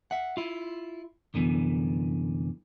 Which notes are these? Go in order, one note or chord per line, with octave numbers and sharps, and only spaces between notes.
E5 F#5
E4 F4
C2 F#2 D3 E3 B3